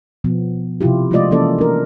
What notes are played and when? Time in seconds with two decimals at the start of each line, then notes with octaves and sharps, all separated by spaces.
0.24 B2 F3 B3
0.81 C3 F3 E4 F4 G4
1.11 F3 G#3 A3 F4 D5 D#5
1.31 E3 A#3 C#4 E4 A4 D5
1.58 D4 A#4